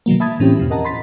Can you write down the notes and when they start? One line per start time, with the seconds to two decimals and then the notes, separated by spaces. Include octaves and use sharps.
0.06 B2 D#3 F#3 A#3
0.20 E5 A5 B5 D#6 G#6 A6
0.40 A2 E3 C4 C#4 G4
0.57 E2 B2 F3
0.70 A#4 D#5 F#5 A5 A#5
0.85 B5 C6 A6 B6